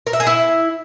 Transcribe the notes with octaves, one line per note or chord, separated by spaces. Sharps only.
A#4
E5
G#4
E4